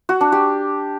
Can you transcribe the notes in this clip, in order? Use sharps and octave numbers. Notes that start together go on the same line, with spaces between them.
F#4
D4
G4